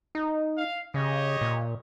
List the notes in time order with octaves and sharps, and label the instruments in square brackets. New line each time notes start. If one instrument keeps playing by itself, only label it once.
[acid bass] D#4
[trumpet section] F5
[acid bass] C#3 [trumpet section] G4 C#5 D#5
[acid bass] A#2